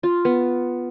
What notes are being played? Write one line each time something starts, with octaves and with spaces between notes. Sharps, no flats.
F4
B3